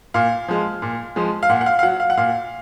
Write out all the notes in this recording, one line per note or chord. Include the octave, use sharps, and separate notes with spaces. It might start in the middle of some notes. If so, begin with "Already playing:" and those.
A#2 F5
F3 G#3
A#2
F3 G#3
F5
A#2 F#5
F#5
F5
F5
F#3 F#5
F5
F#5
A#2 F5